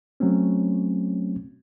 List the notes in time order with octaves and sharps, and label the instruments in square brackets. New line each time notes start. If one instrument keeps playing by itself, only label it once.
[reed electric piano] F#3 A3 C4 C#4